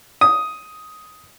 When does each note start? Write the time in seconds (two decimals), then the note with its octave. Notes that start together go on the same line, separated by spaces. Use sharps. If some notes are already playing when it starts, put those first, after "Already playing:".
0.21 D#6